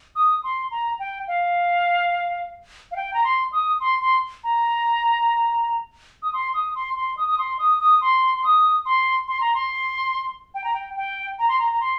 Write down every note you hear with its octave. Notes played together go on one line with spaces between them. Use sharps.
D#6
C6
A#5
G5
F5
F5
G5
A#5
C6
D#6
C6
C6
A#5
D#6
C6
D#6
C6
C6
D#6
D#6
C6
D#6
D#6
C6
C6
D#6
C6
C6
A#5
C6
G5
A#5
G5
G5
A#5
C6
A#5
A#5
C6